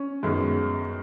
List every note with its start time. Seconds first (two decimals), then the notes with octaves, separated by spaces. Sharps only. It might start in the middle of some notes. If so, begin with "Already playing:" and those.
Already playing: C#4
0.23 F#2 D#3 G#3 B3